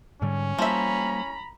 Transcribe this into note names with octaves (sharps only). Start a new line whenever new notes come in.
G#2 D3 G3 C#4
F3 G3 A#3 E5 A#5 B5